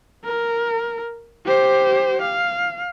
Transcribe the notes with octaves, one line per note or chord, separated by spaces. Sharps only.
A#4
G4 C5
F5